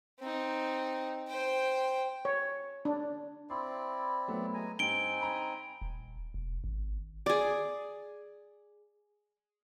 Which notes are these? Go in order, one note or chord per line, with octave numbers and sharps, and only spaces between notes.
C4 D#4
C5 G5
C#5
D4
C4 E4 D5 C6
F#3 A3 B3
G#3 G#5 A#5
G2 C4 D#4 G5 G#5 D7 G7
G5 A#5 B5
D#1
E1
G#1
G#4 D5